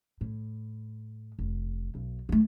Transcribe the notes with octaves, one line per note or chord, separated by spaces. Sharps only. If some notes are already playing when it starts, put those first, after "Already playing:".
A2
F1
B1
A3 A#3